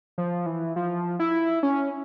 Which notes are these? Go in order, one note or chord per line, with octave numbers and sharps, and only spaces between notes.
F3
E3
F3
E4
C#4